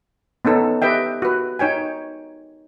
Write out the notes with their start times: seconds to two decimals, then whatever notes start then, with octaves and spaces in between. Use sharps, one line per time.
0.45 B3 C#4 D#4 A4
0.82 G4 B4 D#5 E5 G5
1.22 F#4 B4
1.59 D#4 C#5 G5 G#5